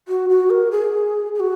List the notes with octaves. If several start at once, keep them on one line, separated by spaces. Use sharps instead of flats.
F#4
F#4
A#4
G#4
G#4
F#4